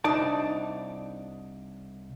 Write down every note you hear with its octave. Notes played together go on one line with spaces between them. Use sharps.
C2 D4 D#4 D5 A5